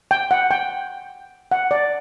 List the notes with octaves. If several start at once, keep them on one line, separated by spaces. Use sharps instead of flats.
G5
F#5
G5
F#5
D5